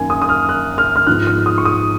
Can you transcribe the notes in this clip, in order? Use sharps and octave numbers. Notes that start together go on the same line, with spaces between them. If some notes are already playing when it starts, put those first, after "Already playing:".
Already playing: F#2 D#3 A#3 G#5
D#6
D#6
F6
F#6
F6
F6
G#2 F3 B3 F#6
F6
D#6
C#6
D#6